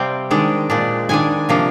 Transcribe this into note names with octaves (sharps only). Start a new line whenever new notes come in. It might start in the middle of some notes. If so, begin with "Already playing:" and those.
Already playing: C3 G3 C4 F5 G5
D#3 G#3 D4
A#2 G#3 D4
D#3 G#3 D4 G#5
C3 F3 A#3 D4